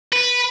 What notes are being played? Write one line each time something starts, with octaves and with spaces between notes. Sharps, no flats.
B4